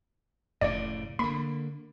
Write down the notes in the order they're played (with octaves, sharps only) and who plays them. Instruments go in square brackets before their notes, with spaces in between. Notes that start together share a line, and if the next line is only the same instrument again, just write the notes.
[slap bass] F1 A2 C#3 [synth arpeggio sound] D5
[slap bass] D3 A#3 [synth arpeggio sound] B5